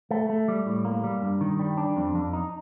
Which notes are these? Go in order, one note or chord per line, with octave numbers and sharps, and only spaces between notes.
A3
A3
G3
A2
A#3
G3
G2
D#3
G3
D4
F2
F2
D#4